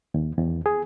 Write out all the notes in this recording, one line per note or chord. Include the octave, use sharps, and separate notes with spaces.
D#2
E2
G#4